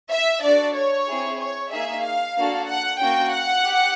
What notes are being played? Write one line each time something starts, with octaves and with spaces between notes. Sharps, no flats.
E5
D4 F#4 A4 D5
C#5
C4 E4 G#4
C#5
A#3 D#4 G#4 E5
F5
A#3 D4 F#4 A4
F#5
A#3 C#4 F#4 G5
F#5
G4